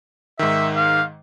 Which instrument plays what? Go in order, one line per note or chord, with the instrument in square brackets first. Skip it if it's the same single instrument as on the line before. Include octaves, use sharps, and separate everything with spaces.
[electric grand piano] G#2 D#3 [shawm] E5
[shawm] F5